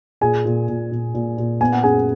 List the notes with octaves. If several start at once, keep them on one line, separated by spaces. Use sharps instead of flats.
A#2 G#4 G#5
A#2
A#2
A#2
A#2
A#2
B3 G#5
F#5
F#2 G#4 G#5